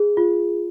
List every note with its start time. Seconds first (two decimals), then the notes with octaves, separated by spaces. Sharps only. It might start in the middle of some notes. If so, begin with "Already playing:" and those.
Already playing: G#4
0.17 F4